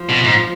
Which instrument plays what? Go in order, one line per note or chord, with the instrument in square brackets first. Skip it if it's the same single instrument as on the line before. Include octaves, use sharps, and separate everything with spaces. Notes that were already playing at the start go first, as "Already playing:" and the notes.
Already playing: [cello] F3
[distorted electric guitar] B2
G#2